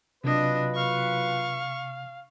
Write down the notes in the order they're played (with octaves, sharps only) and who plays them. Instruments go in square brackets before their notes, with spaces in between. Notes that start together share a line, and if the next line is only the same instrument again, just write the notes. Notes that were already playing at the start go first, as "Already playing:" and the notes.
[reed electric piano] C3 [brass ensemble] F#3 F4 B4 [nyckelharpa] D4 D#5
[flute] F5 [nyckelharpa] C#6